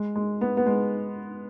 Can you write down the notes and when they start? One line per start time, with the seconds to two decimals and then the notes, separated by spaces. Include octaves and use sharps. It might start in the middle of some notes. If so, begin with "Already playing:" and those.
Already playing: G#3
0.15 G#3
0.41 B3
0.57 B3
0.66 G#3